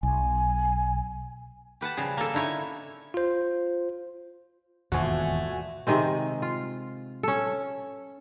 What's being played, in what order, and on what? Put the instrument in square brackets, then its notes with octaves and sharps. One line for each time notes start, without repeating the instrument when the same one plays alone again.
[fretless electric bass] B1 [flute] G#5
[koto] G4 B4 F#5 A5
C#3 F3 G3 G#4
A#3 A4
D3 D#4 E4 C#5 G#5
[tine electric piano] F4 C5
[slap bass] E1 D#2 G#2 [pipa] D3 F3 A3 [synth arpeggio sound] F#4 G#5
[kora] C3 D#3 G#3 C4
F4
C#4 A4